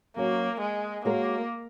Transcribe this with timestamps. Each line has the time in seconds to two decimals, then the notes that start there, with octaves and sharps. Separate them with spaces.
0.16 F#3 A#3 C#4 F#4 C#5
0.60 G#3
1.05 G#3 A#3 F#4 A#4 C#5